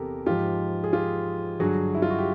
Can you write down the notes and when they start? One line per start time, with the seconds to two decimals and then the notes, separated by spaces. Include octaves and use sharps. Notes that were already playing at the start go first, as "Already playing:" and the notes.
Already playing: E2 C3 G4 A4 A#4
0.26 G#2 F3 F4 G4
0.84 G#4
0.93 F4 G4
1.60 G2 D3 F#3 F#4 G#4
1.95 E4
2.02 F4
2.10 F#4
2.19 G4